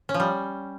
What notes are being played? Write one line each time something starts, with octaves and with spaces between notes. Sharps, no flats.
C#4
F3
G3